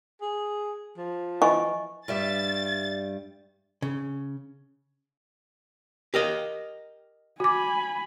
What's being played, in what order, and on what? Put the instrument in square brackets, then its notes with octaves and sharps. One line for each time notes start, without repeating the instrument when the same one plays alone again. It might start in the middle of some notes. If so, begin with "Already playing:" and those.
[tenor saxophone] G#4
F3
[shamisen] E3 [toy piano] D#5 G#5 C#6
[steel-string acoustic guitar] G2 G3 E5 [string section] A6
[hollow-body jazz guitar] C#3
G4 A#4 D#5
[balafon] F#4 D6 [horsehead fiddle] G#5 B5